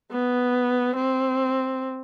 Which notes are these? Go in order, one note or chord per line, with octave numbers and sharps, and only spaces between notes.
B3
C4